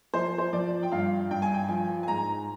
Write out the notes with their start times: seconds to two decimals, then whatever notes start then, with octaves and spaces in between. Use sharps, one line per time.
0.14 F3 C5
0.38 C5
0.53 F3 D5
0.83 G5
0.92 G2 F5
1.31 G2 G5
1.42 G#5
1.54 G5
1.69 F3 G#5
2.03 G#5
2.08 G#2 A#5